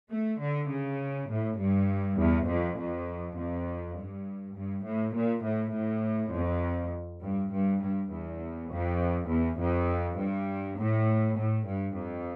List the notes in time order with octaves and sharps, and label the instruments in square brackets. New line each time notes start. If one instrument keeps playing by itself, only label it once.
[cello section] A3
D3
C#3
A2
G2
E2
F2
F2
F2
G2
G2
A2
A#2
A2
A2
F2
G2
G2
G2
E2
F2
E2
F2
G2
A2
A2
G2
F2